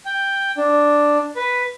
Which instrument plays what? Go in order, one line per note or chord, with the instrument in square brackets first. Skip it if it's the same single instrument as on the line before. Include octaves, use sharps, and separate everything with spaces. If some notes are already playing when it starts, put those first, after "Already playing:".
[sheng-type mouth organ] G5
D4
B4